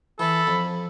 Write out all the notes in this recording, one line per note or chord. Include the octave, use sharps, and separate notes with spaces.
E3 A4 B5
F2